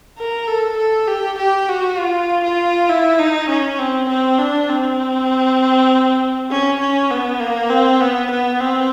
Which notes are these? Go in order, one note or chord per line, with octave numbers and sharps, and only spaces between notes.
A#4
A4
A4
G4
G4
F#4
F4
F4
E4
D#4
C#4
C4
C4
D4
C4
C#4
C#4
B3
A#3
C4
B3
B3
C4